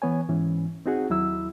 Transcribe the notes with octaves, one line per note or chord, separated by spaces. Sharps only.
E3 B3 C#5 G#5
G#2 E3 C#4
C4 D#4 F#4 G#4 F#5
D#2 F#3 E4 E6